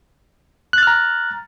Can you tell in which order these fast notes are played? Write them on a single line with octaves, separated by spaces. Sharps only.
F#6 A6 F6 A#5